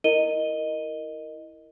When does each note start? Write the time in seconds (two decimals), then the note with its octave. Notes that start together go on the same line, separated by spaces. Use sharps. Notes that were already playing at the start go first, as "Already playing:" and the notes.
0.04 E4 A#4 D#5 D#7 G7